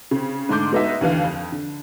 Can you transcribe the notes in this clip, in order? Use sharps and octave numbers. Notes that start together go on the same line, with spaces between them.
C#3 C4
G#2 D3 A3 C6 D6 G6
G#3 B3 D#4 F#4 E5
D#2 D3 E3 F5
F2
D3